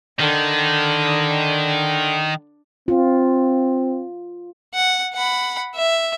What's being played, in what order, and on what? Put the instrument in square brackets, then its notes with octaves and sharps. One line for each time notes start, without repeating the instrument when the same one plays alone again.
[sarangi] D3 [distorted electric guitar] D#3
[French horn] C4 [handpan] F4
[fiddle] F#5
F#5 B5
E5